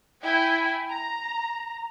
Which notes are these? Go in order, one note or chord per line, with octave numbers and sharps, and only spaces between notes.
E4 G5 G#5
A#5